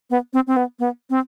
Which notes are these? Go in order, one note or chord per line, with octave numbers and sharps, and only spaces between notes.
B3
C4
C4
B3
B3
C4